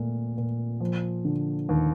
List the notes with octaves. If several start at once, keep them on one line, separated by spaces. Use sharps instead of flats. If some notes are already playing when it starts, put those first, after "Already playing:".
Already playing: A#2 A3
A#2
F3
D3
D#2